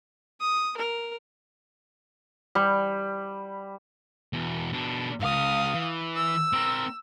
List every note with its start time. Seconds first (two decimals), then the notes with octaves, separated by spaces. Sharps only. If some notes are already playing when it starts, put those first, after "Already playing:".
0.41 D#6
0.77 A#4
2.55 G3
4.33 E2 B2
4.73 B2 D4
5.20 C#2 G#2 F5 D#6
5.74 E3
6.16 E6
6.53 C4 A#4